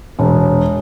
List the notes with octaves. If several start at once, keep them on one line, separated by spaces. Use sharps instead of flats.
E1